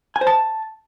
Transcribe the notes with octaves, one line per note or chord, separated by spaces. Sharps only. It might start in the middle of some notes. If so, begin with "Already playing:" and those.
G#5
C5
A5